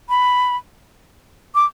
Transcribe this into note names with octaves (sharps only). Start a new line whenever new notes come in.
B5
D6